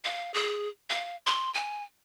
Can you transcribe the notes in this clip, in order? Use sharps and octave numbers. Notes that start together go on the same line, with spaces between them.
F5
G#4
F5
C6
G#5